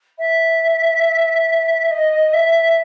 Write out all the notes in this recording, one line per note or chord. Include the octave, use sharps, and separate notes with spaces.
E5
D#5
E5